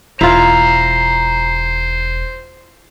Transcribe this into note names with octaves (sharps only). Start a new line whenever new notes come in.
E1 E4 F4 C5 A#5